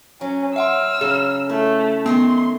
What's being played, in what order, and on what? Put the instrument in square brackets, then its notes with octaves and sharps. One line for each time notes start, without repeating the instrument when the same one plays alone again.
[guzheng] F#3 [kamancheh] C#4
[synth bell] E5 F#5 C6 [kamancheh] E6 F6
[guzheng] C#3 F#3 [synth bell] G#4
[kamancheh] A3 [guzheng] E4
[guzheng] D#3 G#3 A3 [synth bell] B3 [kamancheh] C6